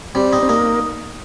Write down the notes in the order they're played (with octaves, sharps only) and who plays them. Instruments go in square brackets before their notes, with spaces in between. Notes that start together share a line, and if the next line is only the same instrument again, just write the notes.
[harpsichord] G3 [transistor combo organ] C4
[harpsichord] D#4
[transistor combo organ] C4
[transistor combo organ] A#3 [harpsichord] D#4